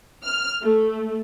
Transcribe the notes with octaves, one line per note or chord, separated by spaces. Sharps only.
F6
A3